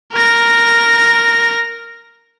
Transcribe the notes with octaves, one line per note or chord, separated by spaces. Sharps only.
A#4 A#6